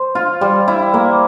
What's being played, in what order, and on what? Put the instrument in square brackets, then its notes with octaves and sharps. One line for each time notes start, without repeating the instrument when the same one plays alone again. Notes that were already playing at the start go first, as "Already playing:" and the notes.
Already playing: [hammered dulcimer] C5
F4
G3
E4
A#3